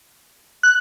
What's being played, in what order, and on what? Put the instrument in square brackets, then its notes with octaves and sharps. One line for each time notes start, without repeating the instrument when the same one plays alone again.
[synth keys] F#6